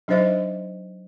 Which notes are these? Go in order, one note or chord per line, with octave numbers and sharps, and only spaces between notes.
F#3 D4 D#4 C5 D#5 E5